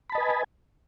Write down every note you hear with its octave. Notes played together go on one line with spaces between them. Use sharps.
B4 D#5 G#5 A5 B5